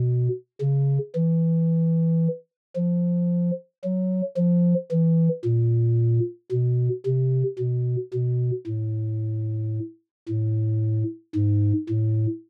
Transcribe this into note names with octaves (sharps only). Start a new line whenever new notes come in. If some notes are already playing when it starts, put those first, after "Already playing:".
Already playing: B2
C#3
E3
F3
F#3
F3
E3
A#2
B2
C3
B2
B2
A2
A2
G#2
A2